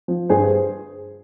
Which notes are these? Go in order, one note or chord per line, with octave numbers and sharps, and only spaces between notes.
F3
G2 G#4 C5